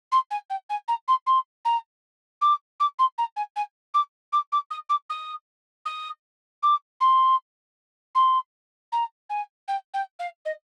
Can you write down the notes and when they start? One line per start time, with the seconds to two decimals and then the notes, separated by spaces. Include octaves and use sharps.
0.12 C6
0.31 G#5
0.50 G5
0.70 G#5
0.88 A#5
1.08 C6
1.26 C6
1.65 A#5
2.41 D6
2.80 D6
2.99 C6
3.18 A#5
3.36 G#5
3.56 G#5
3.94 D6
4.33 D6
4.52 D6
4.71 D#6
4.89 D6
5.10 D#6
5.85 D#6
6.63 D6
7.00 C6
8.15 C6
8.92 A#5
9.30 G#5
9.68 G5
9.94 G5
10.19 F5
10.45 D#5